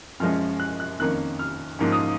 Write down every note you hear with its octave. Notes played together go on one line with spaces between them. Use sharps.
F#2 F3 G#3 C#4 F6
F#6
F#6
F2 D#3 A#3 C#4 F#6
F6
G#2 F3 A#3 C#4
D#6